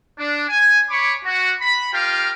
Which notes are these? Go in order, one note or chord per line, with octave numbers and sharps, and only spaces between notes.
D4
G#5
C#5 B5 C#6 D6
F#4
B5
F4 G4 A#4 F5 G5